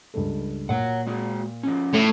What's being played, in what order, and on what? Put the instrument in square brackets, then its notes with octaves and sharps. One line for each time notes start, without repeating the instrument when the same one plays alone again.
[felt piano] C#2 G2 A4
[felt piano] A#2 [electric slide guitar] C#5 F#5
[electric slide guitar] G#3 F#4
F3 C#4
[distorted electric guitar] A2